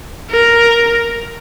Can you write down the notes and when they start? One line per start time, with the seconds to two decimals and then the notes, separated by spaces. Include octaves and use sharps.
0.31 A#4